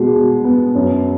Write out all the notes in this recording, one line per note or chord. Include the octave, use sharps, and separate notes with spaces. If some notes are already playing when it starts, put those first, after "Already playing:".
Already playing: B2 G#3
B2
B3
F#2